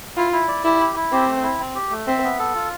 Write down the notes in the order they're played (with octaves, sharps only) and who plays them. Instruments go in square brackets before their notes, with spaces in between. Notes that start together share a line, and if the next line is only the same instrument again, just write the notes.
[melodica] E4 [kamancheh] F4
[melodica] E4
D5
[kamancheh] E4 [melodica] G4
[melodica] E4
E4
[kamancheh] C4 [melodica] G4
[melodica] A3
E4
C4
G4
A3
[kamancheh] C4 [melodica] E5
[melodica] B3
A4
F4